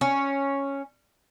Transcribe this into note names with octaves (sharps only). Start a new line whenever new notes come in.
C#4